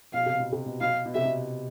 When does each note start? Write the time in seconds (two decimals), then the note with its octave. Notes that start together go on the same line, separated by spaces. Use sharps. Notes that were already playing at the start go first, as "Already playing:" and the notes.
0.13 B2 F5
0.26 C3
0.40 B2
0.52 C3
0.66 B2
0.81 B2 F5
1.06 B2
1.14 C3 E5
1.26 B2